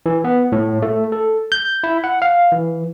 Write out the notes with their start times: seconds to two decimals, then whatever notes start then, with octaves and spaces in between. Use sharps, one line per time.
0.06 E3
0.24 B3
0.52 A2
0.82 A3
1.12 A4
1.52 G6
1.84 E4
2.04 F#5
2.22 F5
2.52 E3